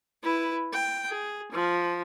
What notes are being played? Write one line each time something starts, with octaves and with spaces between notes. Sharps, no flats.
E4 B4
G5
G#4
F3